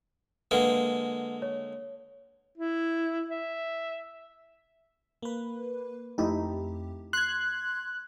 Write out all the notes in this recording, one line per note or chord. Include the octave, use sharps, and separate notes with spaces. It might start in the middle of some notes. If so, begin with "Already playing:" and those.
D3 G#3 A#3 B4 F#5
C#5
E4
E5
A#3 B4
F2 A3 D#4 E4 G4
C6 F#6 G#6